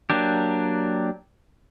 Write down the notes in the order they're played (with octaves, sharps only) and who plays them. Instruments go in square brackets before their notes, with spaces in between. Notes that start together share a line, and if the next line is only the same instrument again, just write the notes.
[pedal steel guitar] F#3 A#3 D4 G4